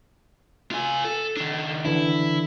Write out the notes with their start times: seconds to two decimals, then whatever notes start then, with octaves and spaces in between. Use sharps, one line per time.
0.71 F4 G#5
1.04 A4
1.37 D#3 D4
1.85 D3 E3 D4 E4